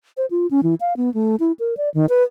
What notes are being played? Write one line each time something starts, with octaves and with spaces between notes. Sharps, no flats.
C5
F4
C#4
E3
F5
B3
A3
E4
A#4
D5
D#3
B4